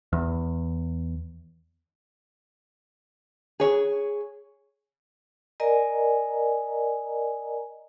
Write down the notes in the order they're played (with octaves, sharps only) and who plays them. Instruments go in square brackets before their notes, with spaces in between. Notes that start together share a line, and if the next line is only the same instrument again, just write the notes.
[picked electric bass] E2
[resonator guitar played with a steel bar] G#4 C#5
[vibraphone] A#4 D5 D#5 G#5 A#5